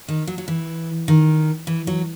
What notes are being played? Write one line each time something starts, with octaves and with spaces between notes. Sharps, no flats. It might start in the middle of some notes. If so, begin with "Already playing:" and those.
D#3
F#3
F#3
E3
D#3
E3
F#3